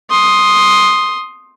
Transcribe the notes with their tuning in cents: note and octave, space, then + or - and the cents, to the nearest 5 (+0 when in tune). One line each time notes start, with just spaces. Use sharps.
C6 +10 D#6 +0